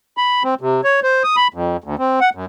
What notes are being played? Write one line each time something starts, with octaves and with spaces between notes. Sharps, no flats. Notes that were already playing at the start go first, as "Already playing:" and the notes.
B5
C4
C3
C#5
C5
D#6
B5
F2
D2
C4
F#5
F#2